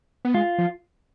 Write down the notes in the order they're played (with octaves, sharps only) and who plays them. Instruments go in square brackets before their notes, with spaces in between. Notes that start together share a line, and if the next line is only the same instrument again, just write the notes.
[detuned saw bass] B3
[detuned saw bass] G#3 [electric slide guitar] F4
[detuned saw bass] F3